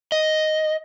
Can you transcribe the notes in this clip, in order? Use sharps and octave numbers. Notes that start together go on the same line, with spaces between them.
D#5